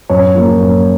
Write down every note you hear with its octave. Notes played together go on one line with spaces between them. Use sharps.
F#2 C#5
F3 A#3
F#2